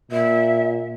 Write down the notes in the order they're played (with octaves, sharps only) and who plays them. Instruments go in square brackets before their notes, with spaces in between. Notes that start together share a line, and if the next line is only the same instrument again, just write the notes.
[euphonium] A#2 [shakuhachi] E5